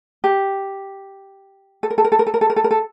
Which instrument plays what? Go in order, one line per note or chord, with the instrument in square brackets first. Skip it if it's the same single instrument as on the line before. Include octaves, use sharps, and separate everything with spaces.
[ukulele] G4
A4
A#4
A4
A#4
A4
A#4
A4
A#4
A4
A#4
A4
A#4
A4